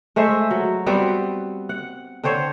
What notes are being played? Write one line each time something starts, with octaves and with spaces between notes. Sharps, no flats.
G#3 A3 C5 E5
F#3
G3 B3 C4 F#4
F#5
D3 C4 C5 C#5